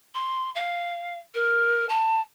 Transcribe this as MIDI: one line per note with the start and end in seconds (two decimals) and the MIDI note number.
0.15 0.50 84
0.55 1.19 77
1.35 1.85 70
1.89 2.20 81